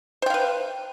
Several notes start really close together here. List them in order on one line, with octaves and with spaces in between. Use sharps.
C5 G5 F5 B4